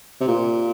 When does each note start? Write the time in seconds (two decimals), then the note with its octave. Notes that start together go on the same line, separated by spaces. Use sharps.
0.21 C3
0.28 A#2